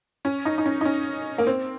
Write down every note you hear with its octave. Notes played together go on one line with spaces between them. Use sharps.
C#4
D#4
D#4
C#4
D#4
C#4
A#3
C4